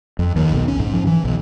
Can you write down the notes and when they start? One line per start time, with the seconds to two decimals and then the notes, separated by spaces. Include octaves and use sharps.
0.19 F2
0.36 D#2
0.53 B1
0.68 C#4
0.80 G#2
0.93 F3
1.07 E3
1.24 B1